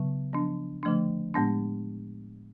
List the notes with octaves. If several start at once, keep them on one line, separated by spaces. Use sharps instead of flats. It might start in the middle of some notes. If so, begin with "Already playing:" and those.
Already playing: C#3 F#3 B3
F3 B3 D4
D3 F3 A3 D4
A2 G#3 B3 D4